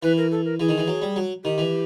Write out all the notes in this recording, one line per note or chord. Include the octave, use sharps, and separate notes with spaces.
E3 B4
A#4
A4
A#4
E3 G#4
D#3
E3
F#3
G3
F#3
D#3 G4
E3